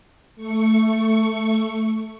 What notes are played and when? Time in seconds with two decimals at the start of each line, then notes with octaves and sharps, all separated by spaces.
0.36 A3 C#6